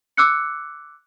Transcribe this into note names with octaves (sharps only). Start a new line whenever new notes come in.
D6 E6 F#6 C#7